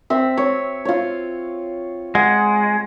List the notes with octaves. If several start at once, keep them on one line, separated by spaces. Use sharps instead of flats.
C4 E5
C#5
F4 C#5
G#3 F#5